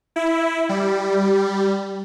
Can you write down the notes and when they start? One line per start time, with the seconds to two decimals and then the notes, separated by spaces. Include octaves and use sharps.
0.16 E4
0.69 G3